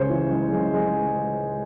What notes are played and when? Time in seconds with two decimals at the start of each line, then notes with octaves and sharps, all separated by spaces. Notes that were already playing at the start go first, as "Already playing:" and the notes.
Already playing: C#2 C#3 C5 C#5
0.09 E3
0.31 G#3
0.52 G#3
0.74 G#3